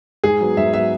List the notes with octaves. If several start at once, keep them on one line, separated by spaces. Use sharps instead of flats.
G#2 G#4
F#3 B3
G#2 E5
F#3 B3 E5